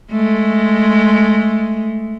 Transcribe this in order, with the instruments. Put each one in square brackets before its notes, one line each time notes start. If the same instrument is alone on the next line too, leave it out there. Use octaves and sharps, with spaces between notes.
[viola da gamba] G#3 A3